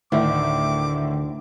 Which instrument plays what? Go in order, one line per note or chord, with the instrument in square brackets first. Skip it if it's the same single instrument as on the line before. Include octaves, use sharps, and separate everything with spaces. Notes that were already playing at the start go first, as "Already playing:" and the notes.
[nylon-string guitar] D2 [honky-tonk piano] A2 D#3 E4 [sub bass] D3 [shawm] D6